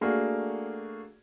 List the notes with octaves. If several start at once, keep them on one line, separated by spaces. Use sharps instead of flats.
A3 A#3 D4 F#4 G#4